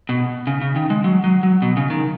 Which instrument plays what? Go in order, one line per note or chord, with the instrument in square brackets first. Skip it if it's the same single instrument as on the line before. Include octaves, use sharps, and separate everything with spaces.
[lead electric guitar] B2
C#3
C#3
D#3
G#3
F#3
F#3
F#3
B2
C#3
D#3